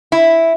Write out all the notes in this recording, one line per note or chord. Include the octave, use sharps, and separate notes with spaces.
E4